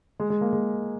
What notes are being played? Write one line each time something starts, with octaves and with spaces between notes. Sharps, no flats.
G#3
G#3
A#3
G#3